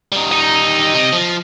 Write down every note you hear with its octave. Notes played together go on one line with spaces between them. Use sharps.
G3 D#4
D#5 A#5
C3
F3